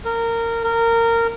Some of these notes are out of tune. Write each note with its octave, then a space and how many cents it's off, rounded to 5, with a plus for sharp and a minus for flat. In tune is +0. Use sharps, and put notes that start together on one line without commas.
A#4 -20
A#4 -20